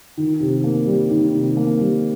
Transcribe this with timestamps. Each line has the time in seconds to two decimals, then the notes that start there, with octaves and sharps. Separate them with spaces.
0.17 D#3
0.40 C3
0.64 A#3
0.87 G3
1.10 D#3
1.34 C3
1.57 A#3
1.81 G3